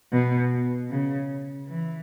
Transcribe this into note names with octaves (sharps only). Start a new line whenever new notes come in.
B2
C#3
E3